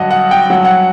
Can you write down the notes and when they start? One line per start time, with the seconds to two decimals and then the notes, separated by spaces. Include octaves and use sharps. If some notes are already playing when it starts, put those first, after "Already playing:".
Already playing: G2 D3 F#3 D#5 F#5
0.11 F#5
0.31 G5
0.50 G2 F#3 F#5
0.65 F#5